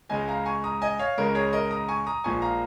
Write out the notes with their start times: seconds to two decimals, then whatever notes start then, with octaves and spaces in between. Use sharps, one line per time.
0.09 C#2 C#3 G#3 D#5 G#5
0.28 F5 A#5
0.46 G#5 C#6
0.64 A#5 D#6
0.82 D#5 G#5
0.99 C#5 F5
1.18 C#2 C#3 G#3 A#4
1.35 G#4 C#5
1.53 A#4 D#5
1.71 A#5 D#6
1.88 G#5 C#6
2.07 A#5 D#6
2.24 A#1 A#2 F3 G#3 G#5 C#6
2.42 F5 A#5